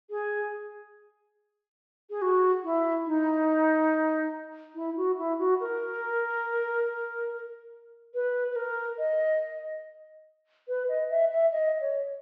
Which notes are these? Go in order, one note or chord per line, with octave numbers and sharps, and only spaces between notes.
G#4
G#4
F#4
E4
D#4
E4
F#4
E4
F#4
A#4
B4
B4
A#4
D#5
B4
D#5
E5
E5
D#5
C#5